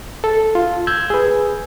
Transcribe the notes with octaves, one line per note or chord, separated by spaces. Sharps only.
A4
F4
E6 G6 G#6
G#4 B4